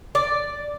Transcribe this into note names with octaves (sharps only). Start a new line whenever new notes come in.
D5